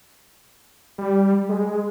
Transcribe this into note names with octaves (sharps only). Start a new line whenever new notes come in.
G3
G#3